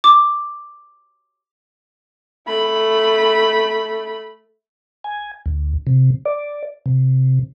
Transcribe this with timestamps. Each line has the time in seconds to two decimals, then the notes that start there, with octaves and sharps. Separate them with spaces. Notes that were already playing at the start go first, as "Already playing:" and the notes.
0.04 D6
2.47 A3 B5
5.04 G#5
5.46 D2
5.87 C3
6.25 D5
6.86 C3